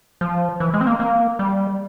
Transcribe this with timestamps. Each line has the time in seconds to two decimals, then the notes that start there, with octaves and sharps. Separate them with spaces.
0.21 F3
0.60 E3
0.74 G#3
0.81 C4
0.87 A#3
1.00 A#3
1.39 G3